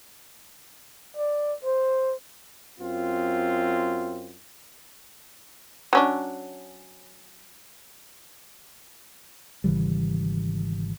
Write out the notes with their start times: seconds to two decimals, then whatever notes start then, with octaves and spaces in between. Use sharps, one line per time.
1.17 D5
1.65 C5
2.80 F#2 C4 F4
5.93 F#3 C#4 D4
9.64 G#1 C#3 E3 G3